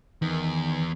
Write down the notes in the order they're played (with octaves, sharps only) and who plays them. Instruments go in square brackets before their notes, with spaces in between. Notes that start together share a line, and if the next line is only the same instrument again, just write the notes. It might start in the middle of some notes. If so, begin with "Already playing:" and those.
[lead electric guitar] E2 [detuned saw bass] D#3